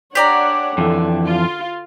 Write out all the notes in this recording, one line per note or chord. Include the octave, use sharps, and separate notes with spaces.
D4 G4 C#5 D5 F#5 A#5
F2 D3 E3
F4